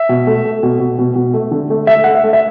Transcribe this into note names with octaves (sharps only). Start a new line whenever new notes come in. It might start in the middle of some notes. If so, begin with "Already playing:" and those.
Already playing: E5
B2
A3
A3
B2
B2
B2
B2
A3
D3
A3
A3 E5
A3 F#5
E5
A3
E5